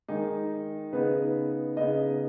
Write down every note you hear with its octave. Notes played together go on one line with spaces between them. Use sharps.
D#3 G#3 D#4 G#4
C#3 B3 D#4 B4
C#3 B3 D#4 D#5